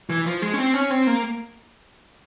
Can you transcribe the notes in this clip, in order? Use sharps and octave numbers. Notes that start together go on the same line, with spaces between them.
E3
F3
G#3
C#4
C4
C#4
C4
A#3